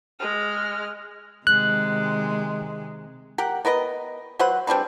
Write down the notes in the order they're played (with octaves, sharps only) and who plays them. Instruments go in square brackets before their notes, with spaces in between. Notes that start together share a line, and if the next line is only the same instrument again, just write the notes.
[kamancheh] G#3 F6
[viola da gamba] C3 D#3 G#3 [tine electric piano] F#6
[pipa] G4 A#4 F#5
B3 A#4 B4 D#5
F#3 B4 C5 F#5
G3 C4 D4 B4